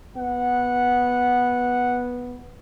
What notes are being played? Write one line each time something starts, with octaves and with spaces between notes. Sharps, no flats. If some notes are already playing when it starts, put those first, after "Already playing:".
B3 F#5